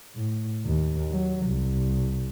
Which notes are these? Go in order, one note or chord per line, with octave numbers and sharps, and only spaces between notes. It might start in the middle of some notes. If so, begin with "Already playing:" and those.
A2
D#2
F#3
C2